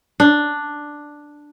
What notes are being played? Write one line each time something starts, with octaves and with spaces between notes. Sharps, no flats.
D4